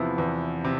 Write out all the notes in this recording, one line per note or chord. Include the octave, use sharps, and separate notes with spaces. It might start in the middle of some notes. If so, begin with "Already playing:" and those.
Already playing: E2 C3 F3 B3 E4
E2
C3